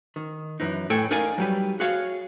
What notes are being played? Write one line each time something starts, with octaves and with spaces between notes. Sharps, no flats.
D#3
F#2 E3 D#4
A2 A4 G5 G#5
D#4 A#4 D5 F5 G#5
F#3 G3 B4
F#4 G#4 C#5 F5